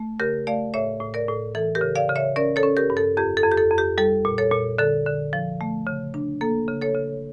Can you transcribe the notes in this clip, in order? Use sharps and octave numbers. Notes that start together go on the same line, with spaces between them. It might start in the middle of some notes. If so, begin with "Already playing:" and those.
Already playing: A3
C#3 G4 A#4
A3 D5 F5
A2 C#5 E5
A2
A#4 D5
A2
E3 A4
G4 A#4
C#3
D5 F5
C#3
C#5 E5
C#4 A#4 D5
A4 C#5
C#4
G4 A#4
G2
A4
F2 G4
A4
F2
G4
A4
F2
G4
G3 A4
A#2
A4 C#5
A#2
D3 A4
D3
F3
A3
C#3
D4
A#3 A4
C#3
A4 C#5
C#3